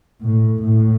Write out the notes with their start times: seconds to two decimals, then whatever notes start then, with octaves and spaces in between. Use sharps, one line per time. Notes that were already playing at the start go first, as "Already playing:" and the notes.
0.22 A2
0.62 A2